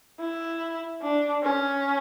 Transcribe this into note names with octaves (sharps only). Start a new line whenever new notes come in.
E4
D4
C#4